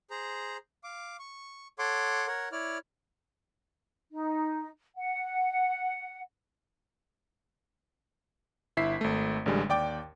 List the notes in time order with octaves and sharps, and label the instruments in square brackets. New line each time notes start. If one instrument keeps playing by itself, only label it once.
[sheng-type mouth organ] G#4 C5 A#5
F5 D6
C#6
A4 C#5 F#5 C6 D6
A#4 C#5 F#5
E4 C#5 D5 F6
[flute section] D#4
F#5
[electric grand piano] G1 E4 E5 B6 C7
G#1 A3
A1 D3 G3 G#3
D#2 D5 G5 D6